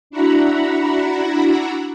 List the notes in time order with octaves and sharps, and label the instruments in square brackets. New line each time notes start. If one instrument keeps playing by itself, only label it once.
[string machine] D4 E4 F#4 F#5 A#5 B5